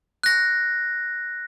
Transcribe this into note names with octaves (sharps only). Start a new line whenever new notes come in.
F#6 A#6